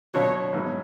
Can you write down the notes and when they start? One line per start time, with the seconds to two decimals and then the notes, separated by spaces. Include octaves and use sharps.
0.14 B2 F#3 B3 D4 F4 C#5
0.53 A1 G#2 F#3 B3